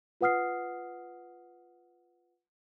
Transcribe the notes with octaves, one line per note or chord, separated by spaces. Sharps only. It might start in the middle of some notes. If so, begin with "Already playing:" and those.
F4 B4 F#5 D#6 F6 C7